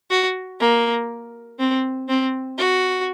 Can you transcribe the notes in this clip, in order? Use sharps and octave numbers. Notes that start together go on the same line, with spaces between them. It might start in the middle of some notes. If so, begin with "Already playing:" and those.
F#4
A#3
C4
C4
F#4